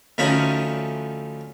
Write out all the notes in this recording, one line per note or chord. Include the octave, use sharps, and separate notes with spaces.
D2 D3 F3 C#4 D#4 B5